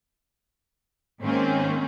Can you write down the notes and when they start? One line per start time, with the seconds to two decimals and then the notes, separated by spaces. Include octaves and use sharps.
1.21 G#2 D#3 A#3 C4 C#4